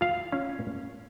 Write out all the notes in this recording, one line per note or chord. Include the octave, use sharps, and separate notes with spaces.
F4 F5
C#4